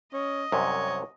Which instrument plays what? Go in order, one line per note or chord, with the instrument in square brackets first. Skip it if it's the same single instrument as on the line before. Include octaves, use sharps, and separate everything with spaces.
[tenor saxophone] C#4 [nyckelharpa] D#5
[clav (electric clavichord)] C2 F#2 C3 [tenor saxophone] C#5